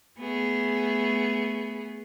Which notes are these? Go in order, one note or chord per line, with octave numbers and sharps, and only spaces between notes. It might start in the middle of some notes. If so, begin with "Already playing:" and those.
A3 B3 G#4